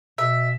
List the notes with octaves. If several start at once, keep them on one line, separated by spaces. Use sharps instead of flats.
B2 E5